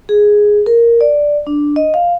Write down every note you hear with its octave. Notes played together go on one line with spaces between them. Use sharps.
G#4
A#4
D5
D4
D#5
F5